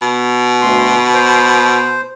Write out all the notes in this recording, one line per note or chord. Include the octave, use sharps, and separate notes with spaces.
B2
D2 C6
C5